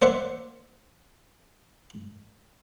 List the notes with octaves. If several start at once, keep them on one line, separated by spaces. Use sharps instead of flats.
A#3 C5 D5 E5 F#5